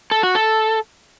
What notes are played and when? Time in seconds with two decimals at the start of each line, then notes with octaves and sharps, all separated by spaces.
0.11 A4
0.23 F#4
0.35 A4